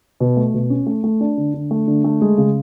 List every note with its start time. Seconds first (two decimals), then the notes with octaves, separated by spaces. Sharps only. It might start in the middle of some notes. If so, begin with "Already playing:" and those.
0.20 B2
0.37 A3
0.54 B2
0.70 C#4
0.86 A3
1.04 A3
1.21 D4
1.38 D3
1.54 D3
1.71 A3
1.88 D3
2.04 A3
2.22 G#3
2.38 C#3